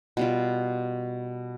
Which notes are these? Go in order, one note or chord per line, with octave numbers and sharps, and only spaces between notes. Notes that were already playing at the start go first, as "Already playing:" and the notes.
B2 G3 F4